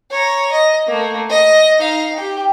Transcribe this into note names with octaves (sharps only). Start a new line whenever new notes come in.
C#5 A#5
D#5
A3 A#3
D#5
D#4 F5
G4 G5